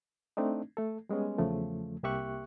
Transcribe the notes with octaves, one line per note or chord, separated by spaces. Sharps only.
A3 C4 D4 D#4
A3 A4
G3 G#3 B3 C#4
E2 C#3 F3 A3
C2 A#3 G4 E5 C#6 F#6